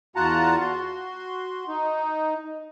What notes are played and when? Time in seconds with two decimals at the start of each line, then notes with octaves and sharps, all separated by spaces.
0.16 E2 F4 F#4 F#5 A5 A#5
0.60 F#4 C6
1.68 D#4